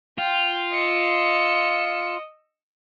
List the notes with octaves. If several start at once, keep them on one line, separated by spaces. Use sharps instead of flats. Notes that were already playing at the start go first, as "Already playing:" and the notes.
F4 G5
D#5 E6 C#7